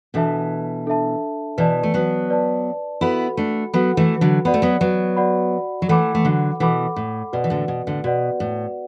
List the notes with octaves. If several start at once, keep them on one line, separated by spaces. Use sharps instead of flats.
B2 E3 D4 A4 E5 A5
D4 A4 E5 A5
B2 E3 B4 D5 A5
A3
F#3 B3
B4 D5 A5
B3 E4 F#4 A4 F#5 B5
A3 D4
F#3 B3 F#4 A4 F#5 B5
E3 A3
D3 F#3
B3 F#4 D5 F#5 B5
A3
F#3 B3
F#3 B3
F#4 D5 F#5 B5
F#3
E3 A3 A4 F#5 B5 D6
A3
D3 F#3
B2 E3 A4 F#5 B5 D6
A2
B2 F#4 B4 D5 F#5
E3
A2 D3
B2
A2 D3
B2 F#4 B4 D5 F#5
A2